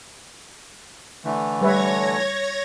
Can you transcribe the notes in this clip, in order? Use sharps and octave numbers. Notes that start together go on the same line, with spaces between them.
D3 E3 A3
G3 B4 C#5 E5 G#6 A#6